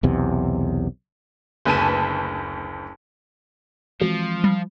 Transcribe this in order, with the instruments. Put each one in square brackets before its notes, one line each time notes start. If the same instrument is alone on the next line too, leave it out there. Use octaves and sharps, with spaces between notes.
[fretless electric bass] B1 E2 C3
[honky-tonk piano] F#1 D2 B4 G#5 A5 D#7
[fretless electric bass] E3 G#3 C4 [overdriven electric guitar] F3 [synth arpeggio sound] F#4
[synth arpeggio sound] G3